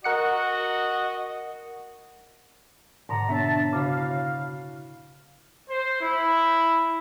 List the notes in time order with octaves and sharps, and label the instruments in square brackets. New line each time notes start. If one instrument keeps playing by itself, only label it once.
[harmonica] F#4 D#5 [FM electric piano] A#4 F#5 C#7
[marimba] G#2 B2 D3 [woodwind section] D5 F#5 A#5
[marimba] B3 D4 C#5 [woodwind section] E5 A5
[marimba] C#3 C#5 [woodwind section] E4 F#4 F5
[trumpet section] C5
E4